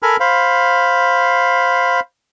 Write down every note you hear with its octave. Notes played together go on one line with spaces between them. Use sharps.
A4 A#4 G#5 B5 F6
C5 F5 B5